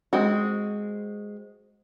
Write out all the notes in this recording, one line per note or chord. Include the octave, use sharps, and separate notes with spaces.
G#3 C4 F#4